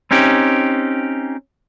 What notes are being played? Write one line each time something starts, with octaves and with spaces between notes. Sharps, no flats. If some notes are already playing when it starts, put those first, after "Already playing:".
C4 C#4 D#4 G4